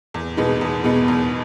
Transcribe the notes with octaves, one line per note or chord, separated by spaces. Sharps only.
E2
B2 G#3 B3 D#4
E2
B2 G#3 B3 D#4
E2